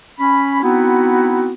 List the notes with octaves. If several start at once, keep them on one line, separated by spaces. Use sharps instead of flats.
C#4 B5
B3 C4 D#4 E4 F#4